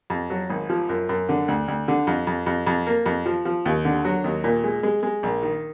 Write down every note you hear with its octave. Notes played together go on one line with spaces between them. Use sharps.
F2
F#3
G#1
F3
F#2
F#2
D3
D2
D2
D3
F2
F2
F2
F2
A#3
F2
F3
F3
D#2
D3
F#3
D#2
A#2
G#3
G#3
G#3
A#1
D#3